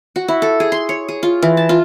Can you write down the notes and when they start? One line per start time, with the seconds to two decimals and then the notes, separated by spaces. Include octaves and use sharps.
0.16 F#4
0.28 E4
0.42 A4
0.60 G#4
0.72 C6
0.89 C#5
1.09 G#4
1.23 F4
1.42 E3
1.57 A5
1.69 F4